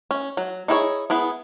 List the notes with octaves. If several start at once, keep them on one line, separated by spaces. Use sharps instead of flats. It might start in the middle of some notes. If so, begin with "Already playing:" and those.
C#4
F#3
D#4 E4 G#4 C#5
B3 E4 G#4